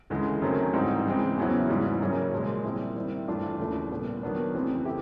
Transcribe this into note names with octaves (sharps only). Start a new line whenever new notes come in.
D2 C#3 E3 G#3
F#2 D#3 F#3 A3 C4
G#2 E3 G3 C4 D#4
C#3 E3 G#3 C4
E2 C#3 F#3 B3 E4
G#2 E3 G3
F#2 C#3 F#3 A#3 C#4
A#2 F3 G#3
A#2 G3 C4 E4
D#3 G3 C4 E4
G2 E3 A3 D4 F4
D#2 C#3 E3 A3 D4
A#2 G3 B3
D#3 F#3 B3 D4
F2 C#3 E3 A3 C4
E4 G4